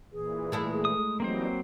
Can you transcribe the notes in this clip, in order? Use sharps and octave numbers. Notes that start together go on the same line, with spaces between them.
A#2 E3 G#4
G#3 A3 E4
D#6
E3 F#3 G3 A#3 C4 D#4 C5